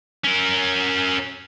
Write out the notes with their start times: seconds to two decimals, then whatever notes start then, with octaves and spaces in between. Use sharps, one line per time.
0.25 C#4 A#4